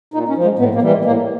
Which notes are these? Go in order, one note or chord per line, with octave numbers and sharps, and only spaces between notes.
A#2 D#4
C#4
F3
G#3
A2 B3
A#3
E3 G3
G#3
A2 A#3